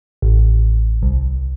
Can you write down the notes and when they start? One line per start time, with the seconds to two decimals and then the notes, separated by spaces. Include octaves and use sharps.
0.22 A1
1.02 C2